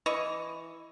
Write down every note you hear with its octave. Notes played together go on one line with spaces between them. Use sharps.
E3 D#5 C#6